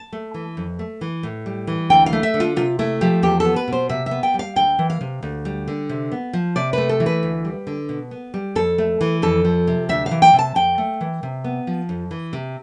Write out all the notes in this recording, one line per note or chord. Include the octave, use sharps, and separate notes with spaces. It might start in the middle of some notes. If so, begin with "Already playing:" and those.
Already playing: A5
A3
E3
F2
A3
E3
A2
G3
E3
D2 G5
F5
A3
E5
D3
F4
C3 F4
A3 E4
F3 G4
E2 G4
B3 A4
B4
B2 C5
C3 E5
E5
B3
G5
G3
F5
D2 G5
E3
F5
C3
D2
G3
D3
C3
B3
F3
C3 D5
A3 B4
A4
E3
B4
D2
G3
D3
B2
B3
G3
F2 A4
A3
E3
F2 A4
F3
C3
D2 E5
F5
E3
G5
C3
A5
F2 G5
A3
E3
C3
B3
F3
F2
E3
C3